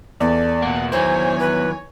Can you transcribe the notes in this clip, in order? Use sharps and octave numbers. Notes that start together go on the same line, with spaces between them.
E2 A4 D5
B2 A#3 F#5
D#3 F#3 E4 C5 C#5 G#5
B4